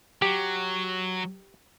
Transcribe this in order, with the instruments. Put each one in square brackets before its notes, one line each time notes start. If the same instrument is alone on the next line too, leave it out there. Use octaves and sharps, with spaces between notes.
[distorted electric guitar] F#3 [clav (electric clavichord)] G4